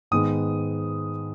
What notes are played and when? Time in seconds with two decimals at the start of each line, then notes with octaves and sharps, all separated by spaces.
0.11 G#2 D#3 G#3 B3 D#6